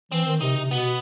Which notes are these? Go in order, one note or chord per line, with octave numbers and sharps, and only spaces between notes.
E3 C4
D#3
C3 D#4
C3
B2 B3